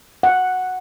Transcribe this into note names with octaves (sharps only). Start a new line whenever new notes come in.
F#5